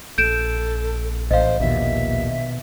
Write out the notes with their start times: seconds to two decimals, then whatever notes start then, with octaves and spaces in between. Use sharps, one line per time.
0.18 A#1 A4 G6 D7 E7
1.31 A1 C5 D#5 F5
1.60 A#1 D#2 B2 E5